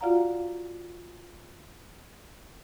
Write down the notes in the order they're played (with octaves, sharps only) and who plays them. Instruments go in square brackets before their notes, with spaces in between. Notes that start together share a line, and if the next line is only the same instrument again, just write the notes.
[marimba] F4 F#4 D5 F5 F#5 A#5